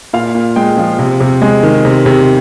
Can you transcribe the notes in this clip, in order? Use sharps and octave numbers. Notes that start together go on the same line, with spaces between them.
A#2 F5
A#2
G#3 G5
F3
C3
C3
G#3
D#3
C3
C3